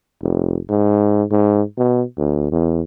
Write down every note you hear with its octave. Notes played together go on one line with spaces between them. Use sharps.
F1
G#2
G#2
B2
D2
E2